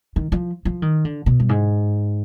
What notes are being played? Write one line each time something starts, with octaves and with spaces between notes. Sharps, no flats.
D#3
F3
F3
D#3
D3
B2
G2
G#2